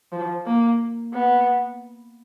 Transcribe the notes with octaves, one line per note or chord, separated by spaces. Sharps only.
F3
A#3
B3